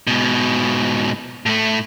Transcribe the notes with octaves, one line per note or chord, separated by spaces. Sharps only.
G#2 B2
A2 A3